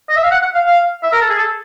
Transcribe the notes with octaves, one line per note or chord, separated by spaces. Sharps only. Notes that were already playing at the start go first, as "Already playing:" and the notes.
D#5
E5
F5
F#5
F#5
F5
F5
E5
A#4
A4
G#4
A4